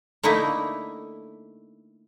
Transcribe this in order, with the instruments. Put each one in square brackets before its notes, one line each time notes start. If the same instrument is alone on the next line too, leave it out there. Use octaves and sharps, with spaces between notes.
[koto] D3 A3 A#3 D#4 E4